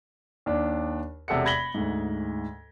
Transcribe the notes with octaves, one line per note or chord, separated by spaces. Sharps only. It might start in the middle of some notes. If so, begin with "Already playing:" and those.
D#2 D4
E1 C3 A4 F#5 C#7
B5 G#6 A#6 B6 F#7 G7
D2 G#2